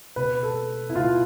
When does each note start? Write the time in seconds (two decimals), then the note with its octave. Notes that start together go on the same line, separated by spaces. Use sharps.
0.16 B2 B4
0.43 A4
0.90 E4
0.96 B2 F4